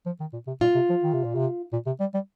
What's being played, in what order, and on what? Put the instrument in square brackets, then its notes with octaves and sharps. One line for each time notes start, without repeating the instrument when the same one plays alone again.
[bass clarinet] F3
D#3
A#2
C3
[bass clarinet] A#2 [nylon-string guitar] F4
[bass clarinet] C3
F3
D#3
C3
A#2
C3
A#2
C3
G3
G3